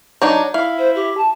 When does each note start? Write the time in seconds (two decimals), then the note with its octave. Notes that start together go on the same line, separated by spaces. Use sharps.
0.22 F#3 D4 D#4
0.54 E4 F5
0.79 C5
0.96 G4
1.17 A5